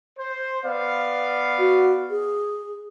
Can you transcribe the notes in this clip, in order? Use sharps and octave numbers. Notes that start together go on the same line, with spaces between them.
C5
B3 D5 F5
F#4
G#4